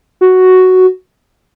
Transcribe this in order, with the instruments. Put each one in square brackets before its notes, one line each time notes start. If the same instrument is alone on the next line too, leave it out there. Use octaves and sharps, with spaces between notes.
[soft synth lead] F#4